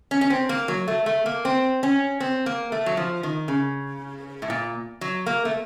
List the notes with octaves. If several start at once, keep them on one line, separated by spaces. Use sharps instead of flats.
C#4
C#4
C4
A#3
F#3
A3
A3
A#3
C4
C#4
C4
A#3
A3
F#3
F3
D#3
C#3
A2
A#2
F#3
A#3
A3